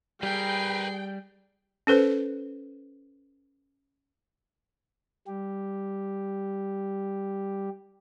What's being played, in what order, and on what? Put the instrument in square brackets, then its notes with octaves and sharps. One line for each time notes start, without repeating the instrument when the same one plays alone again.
[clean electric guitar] G3 [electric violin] G#4 C7 [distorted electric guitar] A#4 B4 [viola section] G5
[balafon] C#4 A4 B4 C5
[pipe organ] G3 G4